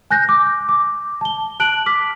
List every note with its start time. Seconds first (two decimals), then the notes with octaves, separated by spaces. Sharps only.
0.11 G#5 F#6 G6 A#6
0.29 D6
0.69 D6
1.21 A5 G7
1.60 A5 F#6 D7 F#7
1.86 D6 F6 B6